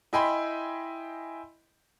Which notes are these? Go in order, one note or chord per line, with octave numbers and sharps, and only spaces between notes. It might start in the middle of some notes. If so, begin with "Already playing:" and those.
E4 D#5 G5 G#5 B5 C6